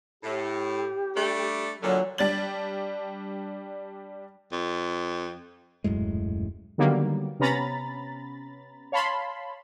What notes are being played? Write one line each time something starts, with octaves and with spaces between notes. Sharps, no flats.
A2 G4
G3 A3 D4
A#2 D3 F#3
G3 D4 A6 F#7
F2
D#1 F#2 A2 G#3
D3 D#3 F#3 G3 A#3 B3
C3 B3 C#4 A#5 B5 A6
C#5 F5 A5 B5 C6